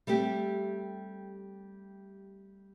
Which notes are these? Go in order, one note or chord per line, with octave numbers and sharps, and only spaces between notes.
G3 A3 C4 G4